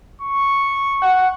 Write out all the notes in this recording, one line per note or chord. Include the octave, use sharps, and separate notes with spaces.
C#6
F#5